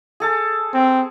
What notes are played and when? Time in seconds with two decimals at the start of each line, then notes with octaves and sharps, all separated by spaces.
0.20 G#4 A4 A5
0.74 C4